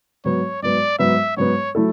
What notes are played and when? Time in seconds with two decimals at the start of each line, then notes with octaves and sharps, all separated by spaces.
0.24 G#2 F#3 B3 C#5
0.62 G#2 F#3 B3 D5
0.99 G#2 F#3 B3 E5
1.37 G#2 F#3 B3 C#5
1.75 F#3 A3 E4 A4